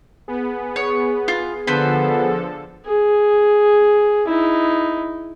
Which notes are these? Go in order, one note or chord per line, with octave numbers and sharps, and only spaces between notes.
B3 G#4
C#5
F4
D3 F3 B3 A4 B4 C5
G#4
D#4 E4